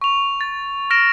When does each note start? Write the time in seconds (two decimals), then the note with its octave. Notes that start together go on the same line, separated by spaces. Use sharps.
0.01 C#6 F7
0.41 A6
0.90 F6 A#6 D7 E7